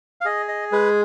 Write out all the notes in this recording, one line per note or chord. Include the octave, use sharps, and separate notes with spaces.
F5
G#4 D#5
D#5
G#3 B4